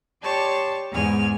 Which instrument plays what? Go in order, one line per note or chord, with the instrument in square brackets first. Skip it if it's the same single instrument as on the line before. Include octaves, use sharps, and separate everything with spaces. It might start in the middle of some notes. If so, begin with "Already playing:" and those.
[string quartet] G4 C#5 D5 A5 C6 C#6
E2 G#2 G#5 F6